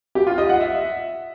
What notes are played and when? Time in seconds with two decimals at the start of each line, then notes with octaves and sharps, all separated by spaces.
0.15 G4
0.27 F4
0.38 D#5
0.49 F#5
0.61 E5